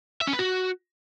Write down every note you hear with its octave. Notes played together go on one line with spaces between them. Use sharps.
E5
C#4
B4
F#4